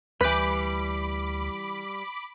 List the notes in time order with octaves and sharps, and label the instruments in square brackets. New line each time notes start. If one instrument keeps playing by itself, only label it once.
[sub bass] D2 [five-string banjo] E3 B4 [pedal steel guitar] G3 G6 [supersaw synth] B5 D6